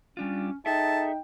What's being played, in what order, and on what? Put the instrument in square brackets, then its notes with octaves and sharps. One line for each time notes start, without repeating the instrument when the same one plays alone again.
[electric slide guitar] G3 D4 F4 [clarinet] C#4
[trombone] D#4 [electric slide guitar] G#4 A4 E5 [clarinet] G5 [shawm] A5